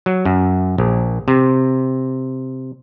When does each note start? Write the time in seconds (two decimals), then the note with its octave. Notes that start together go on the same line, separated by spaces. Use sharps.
0.06 F#3
0.25 F#2
0.78 A#1
1.28 C3